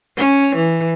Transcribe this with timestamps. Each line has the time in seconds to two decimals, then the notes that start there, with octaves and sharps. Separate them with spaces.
0.17 C#4
0.56 E3